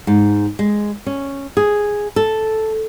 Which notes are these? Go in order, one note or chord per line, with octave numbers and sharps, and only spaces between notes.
G#2
G#3
C#4
G#4
A4